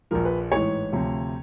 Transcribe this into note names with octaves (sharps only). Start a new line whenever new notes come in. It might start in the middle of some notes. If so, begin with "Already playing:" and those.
A#1 A#2 F3 A#4
B4
A1 G#2 E3 C#5
D2 C3 F3